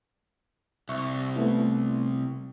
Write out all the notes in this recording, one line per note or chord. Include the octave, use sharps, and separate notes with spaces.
C2 E5 C#6
A3 B3 E4